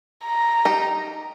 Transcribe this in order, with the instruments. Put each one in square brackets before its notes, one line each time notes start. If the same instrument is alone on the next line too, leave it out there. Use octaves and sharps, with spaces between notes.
[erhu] A#5
[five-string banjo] D#4 G4